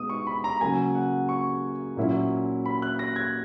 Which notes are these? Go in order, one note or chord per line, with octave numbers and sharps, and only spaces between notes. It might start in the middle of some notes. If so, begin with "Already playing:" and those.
Already playing: B2 G#3 B3 D#4 D#6
C#6
B5
A#5
C#3 F#3 A#3 G#5
F#5
C#6
A#2 F#3 A#3 C#4 E4
B5
F#6
A#6
G#6